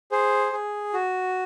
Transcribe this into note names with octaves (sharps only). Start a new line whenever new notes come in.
G#4 C5
G#4
F#4